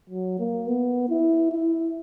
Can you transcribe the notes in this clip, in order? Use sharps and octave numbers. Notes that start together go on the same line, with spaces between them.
F#3
A#3
B3
E4
E4